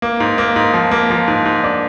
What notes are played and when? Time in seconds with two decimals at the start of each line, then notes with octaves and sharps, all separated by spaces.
0.02 A#3
0.20 G#2
0.38 A#3
0.56 G#2
0.74 F3
0.91 A#3
1.10 F3
1.28 G#2
1.45 G#2
1.64 D4